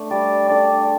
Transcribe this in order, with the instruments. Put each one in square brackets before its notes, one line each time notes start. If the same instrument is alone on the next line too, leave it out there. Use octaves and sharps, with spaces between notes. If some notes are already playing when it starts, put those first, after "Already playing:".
Already playing: [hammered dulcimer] A3 D4
[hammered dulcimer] G3 [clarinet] D5
[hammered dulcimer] D4 A4 [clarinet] D5